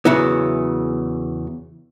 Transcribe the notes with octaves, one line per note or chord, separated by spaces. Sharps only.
E2 C#3 F#3 B3 E4